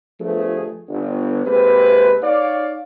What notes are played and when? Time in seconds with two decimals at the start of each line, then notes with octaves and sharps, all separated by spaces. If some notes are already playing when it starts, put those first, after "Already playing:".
0.20 G1 F3 A3 G#4
0.89 G1
1.46 C3 G#3 A#3 C4 B4
2.23 D#4 C#5 D5 F5